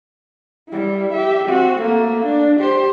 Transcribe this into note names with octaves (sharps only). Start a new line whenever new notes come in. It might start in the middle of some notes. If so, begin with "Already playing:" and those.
G3 E4
G4 E5
C4 F#4
A3 A#3
D4
G4 C5